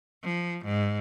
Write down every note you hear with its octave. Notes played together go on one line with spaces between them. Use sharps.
F3
G#2